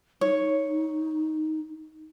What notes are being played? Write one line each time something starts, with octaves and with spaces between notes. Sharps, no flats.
D#4 C#5